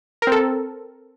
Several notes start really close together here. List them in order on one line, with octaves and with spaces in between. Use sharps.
A#4 C4 A4